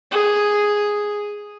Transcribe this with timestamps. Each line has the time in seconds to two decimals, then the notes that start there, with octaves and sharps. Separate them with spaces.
0.11 G#4